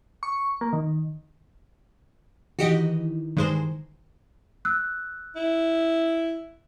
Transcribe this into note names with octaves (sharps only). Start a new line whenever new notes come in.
C#6
A#3
D#3
D#3 E3 F#4 G4 D#5
G2 D#3 G#3 C5
E6 F#6
E4